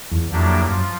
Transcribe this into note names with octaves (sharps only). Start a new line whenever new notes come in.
E2
F2 A2 F#3 A#3 D4 G4
F#2 F3